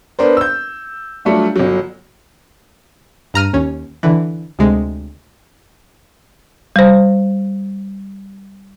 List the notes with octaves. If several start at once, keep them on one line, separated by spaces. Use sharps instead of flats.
B3 D4 A#4 C5
E6 G6
F#3 G3 A3 D4 F4
G1 F#3
G2 A#5 F6 D#7
D#2 C#4
D3 E3
D2 C3 G#3
G3 C5